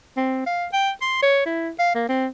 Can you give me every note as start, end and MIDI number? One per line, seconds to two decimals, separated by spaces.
0.17 0.43 60
0.46 0.67 77
0.73 0.91 79
1.02 1.18 84
1.22 1.45 73
1.46 1.70 64
1.79 1.93 77
1.95 2.05 58
2.09 2.27 60